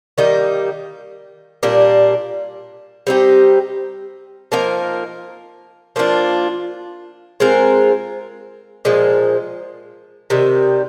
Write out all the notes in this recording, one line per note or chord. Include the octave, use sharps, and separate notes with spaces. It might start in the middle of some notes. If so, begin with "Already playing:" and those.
D#3 G3 A#3 D#4
A#2 G3 A#3 D4
G3 C4 D#4 G4
F3 A#3 D#4 A#4
F3 A#3 D4 F4
G#3 C4 F4 A#4
A#2 F3 G#3
C3 D#3 G3